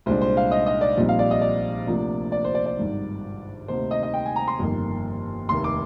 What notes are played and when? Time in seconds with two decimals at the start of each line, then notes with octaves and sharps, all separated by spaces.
0.06 C2 A#2 G#3 D4 C5
0.21 C5
0.37 F5
0.51 D#5
0.66 D#5
0.81 D5
0.97 A#1 A#2 G3 C4 D#4
1.09 F5
1.19 D5
1.31 D#5
1.41 D5
1.87 D2 C3 F3 A#3 D4
2.32 D5
2.44 C5
2.55 D5
2.66 D5
2.77 G#1 G2 D#3
3.68 D2 C3 D#3 A#3 D#4 C5
3.91 D#5
4.03 D#5
4.14 G5
4.26 G#5
4.36 A#5
4.48 C6
4.59 G1 F2 D#3 A#3
5.49 F1 D#2 D#3 A#3 C6
5.64 D6